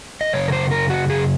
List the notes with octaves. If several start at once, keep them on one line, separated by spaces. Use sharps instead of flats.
D#5
F#2 C#3 C#5
A#4
C5
A#4
F#4
G#4